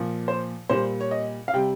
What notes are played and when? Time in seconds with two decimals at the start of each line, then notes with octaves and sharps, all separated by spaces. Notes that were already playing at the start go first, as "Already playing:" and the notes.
Already playing: A#2 F3
0.28 C5
0.70 A#2 G3 C5
1.01 C#5
1.11 D#5
1.48 F5
1.54 C3 G3 G5